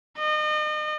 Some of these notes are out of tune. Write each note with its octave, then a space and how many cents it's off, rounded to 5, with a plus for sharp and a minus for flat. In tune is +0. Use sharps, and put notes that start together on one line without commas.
D#5 -35